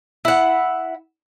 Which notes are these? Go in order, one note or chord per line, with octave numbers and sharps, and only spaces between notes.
E4 F#5